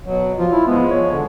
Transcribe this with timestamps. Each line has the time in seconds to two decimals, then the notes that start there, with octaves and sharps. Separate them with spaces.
0.05 B2 F#3
0.39 F3 F4
0.53 E4
0.67 F3 G#3 B3
0.91 C#5
1.11 D3